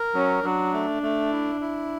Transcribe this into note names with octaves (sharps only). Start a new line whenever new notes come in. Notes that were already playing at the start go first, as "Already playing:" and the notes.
Already playing: A#4
F#3 C#4
F#3 D4
A3
A3
E4
E4